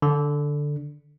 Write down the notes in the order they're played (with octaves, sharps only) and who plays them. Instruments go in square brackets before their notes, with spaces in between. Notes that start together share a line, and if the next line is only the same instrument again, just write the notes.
[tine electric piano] D3